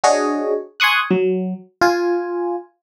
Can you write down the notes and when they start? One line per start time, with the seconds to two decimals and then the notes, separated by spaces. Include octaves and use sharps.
0.04 D4 F#4 G#4 C#5 D#5
0.80 G#5 C6 C#6 D#6 F#6
1.11 F#3
1.81 F4 G#5